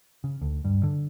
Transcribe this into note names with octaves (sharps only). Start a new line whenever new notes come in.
C#3
D2
G2
D3